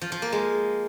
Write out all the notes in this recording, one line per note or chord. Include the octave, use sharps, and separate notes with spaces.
F3
F3
A#3
G#3